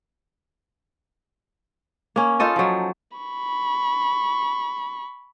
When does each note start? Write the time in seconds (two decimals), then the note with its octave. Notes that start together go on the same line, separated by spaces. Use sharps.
2.16 A#3 C#4
2.40 D#4 F4 A4 D#5
2.56 F3 F#3
3.17 B5 C#6